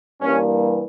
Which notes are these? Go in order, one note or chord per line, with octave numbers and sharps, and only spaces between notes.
G2 E3 G3 A#3 C#4